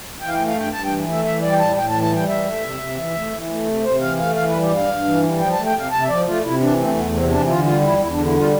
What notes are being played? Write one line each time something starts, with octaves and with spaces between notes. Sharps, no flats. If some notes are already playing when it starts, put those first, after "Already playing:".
E3 G5
F5
G5
A3
F5
G2 G5
G2 A5
G5
E3
A3 E5
E3 E5
G3 D5
G5
A2 A5
A2 G5
A5
E3
A5
G3 G5
E3 E5
A3
C3
C3
E3
A3
E3
A3
C3
C3 C5
E3 F5
A3 F5
E3 F5
B4
G3
G4
G2 F5
G2
E3
G3
F3 G5
A5
A3
G5
C3 F5
C3 A5
E5
F3 D5
A3 F4
C3 E4
E3 D4
A3 C4
E2 B3
C3 C4
E3 D4
D3 F4
G3 F4
E2 E4
E2 E4
D4
D3
E4
G3 F4